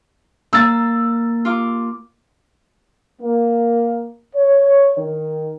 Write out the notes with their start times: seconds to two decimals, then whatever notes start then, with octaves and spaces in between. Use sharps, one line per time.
0.53 A#3 E6 A6
1.45 F4 D6
3.21 A#3
4.35 C#5
4.98 D#3